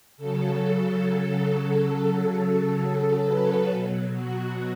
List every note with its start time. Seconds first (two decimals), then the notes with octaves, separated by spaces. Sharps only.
0.17 C#3 F#3 A4
3.25 B4
3.68 B2 F#3
4.13 F#4